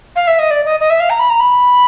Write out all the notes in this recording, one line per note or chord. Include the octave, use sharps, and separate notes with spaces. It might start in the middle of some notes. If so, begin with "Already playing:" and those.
F5
E5
D#5
D5
D#5
D#5
E5
F5
A#5
B5
A#5
B5